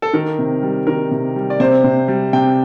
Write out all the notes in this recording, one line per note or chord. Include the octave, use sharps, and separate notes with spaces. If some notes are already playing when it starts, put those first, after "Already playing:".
A4
D#3 A#4
C3
G3
D#3 A#4
C3
G3
D5
C3 C5
C3
G3
C3 G5